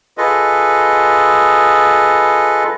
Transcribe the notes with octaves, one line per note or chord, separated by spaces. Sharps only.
F4 G#4 A4 B4 D#5